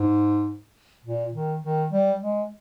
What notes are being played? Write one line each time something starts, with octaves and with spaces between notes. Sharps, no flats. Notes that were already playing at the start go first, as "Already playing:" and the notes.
Already playing: G#2
A#2
D#3
D#3
G3
G#3